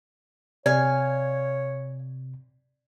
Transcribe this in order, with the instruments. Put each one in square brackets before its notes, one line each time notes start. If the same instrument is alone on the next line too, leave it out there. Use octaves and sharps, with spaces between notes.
[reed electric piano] C3 [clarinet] C#5 [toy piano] D5 [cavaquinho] F5 G#5